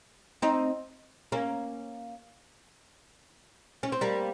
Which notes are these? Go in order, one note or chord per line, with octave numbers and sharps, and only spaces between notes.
C4 D#4
A#3 C#4
C#4
C4
G3 A#3